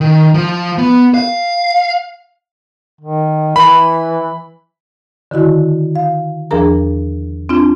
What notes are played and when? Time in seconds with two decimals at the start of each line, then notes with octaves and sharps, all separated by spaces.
0.01 D#3
0.34 F3
0.78 B3
1.14 F5
3.01 D#3
3.56 E3 B5
5.31 D3 D#3 E4 F#4
5.96 F5
6.51 E2 F3 D4 G#4 A#4 A#5
7.49 C4 D4 F4